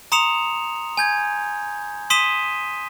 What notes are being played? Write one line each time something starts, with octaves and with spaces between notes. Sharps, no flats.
A#5 C6 D#6 C#7 E7 F7
G#5 G6 G#6
C6 D#6 B6 D#7 E7 G7